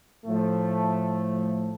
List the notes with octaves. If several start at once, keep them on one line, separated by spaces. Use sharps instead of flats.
A2 F3 A3